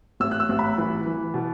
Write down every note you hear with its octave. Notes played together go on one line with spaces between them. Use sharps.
A1 E6
F#6
E6
A1
B5
E3
E3
B2